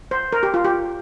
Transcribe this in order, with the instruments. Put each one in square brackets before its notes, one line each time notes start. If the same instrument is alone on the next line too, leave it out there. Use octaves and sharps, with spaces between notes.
[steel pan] C5
A#4
G4
F4
G4